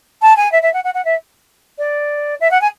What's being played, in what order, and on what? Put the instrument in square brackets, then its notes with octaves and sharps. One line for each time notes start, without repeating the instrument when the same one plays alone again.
[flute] A5
G#5
E5
E5
F#5
F#5
F#5
E5
D5
E5
F#5
G#5